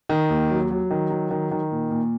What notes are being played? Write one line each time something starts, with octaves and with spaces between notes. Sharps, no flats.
D#3
D#2
F#3
F#3
D#3
F#3
D#3
D#3
A#2
A#2